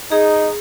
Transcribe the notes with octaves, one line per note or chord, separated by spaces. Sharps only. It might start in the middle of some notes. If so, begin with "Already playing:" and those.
D#4 G#4